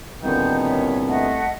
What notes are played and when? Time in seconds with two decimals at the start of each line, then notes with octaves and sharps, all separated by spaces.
0.23 C2 A#2 D3 D#3 B3 G6
0.63 C#5 E5
1.08 A3 D#5 E5 F#5